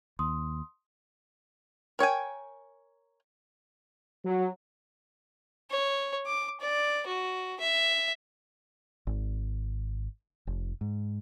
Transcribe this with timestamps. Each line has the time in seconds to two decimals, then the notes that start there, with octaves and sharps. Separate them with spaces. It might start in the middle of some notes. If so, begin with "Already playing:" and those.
0.19 D#2 C6 D#6
1.99 A#4 C#5 G5 G#5
4.24 F#3
5.70 C#5
6.26 D6
6.61 D5
7.07 F#4
7.60 E5
9.07 G#1
10.47 F1
10.81 G#2